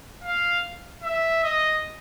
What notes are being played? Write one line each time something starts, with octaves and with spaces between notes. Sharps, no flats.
F5
E5
D#5